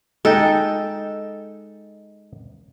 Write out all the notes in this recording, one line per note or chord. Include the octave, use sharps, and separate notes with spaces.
G#3 D#4 A4 G5